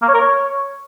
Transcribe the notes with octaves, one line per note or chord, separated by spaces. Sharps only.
A#3
C#5
A#4
C#5